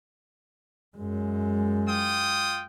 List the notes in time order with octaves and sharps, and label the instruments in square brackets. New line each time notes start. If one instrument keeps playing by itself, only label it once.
[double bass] F#2 G#3
[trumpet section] F4 G5 D#6